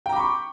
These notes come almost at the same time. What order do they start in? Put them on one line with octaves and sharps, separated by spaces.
G5 A#5 D6 B5 C#6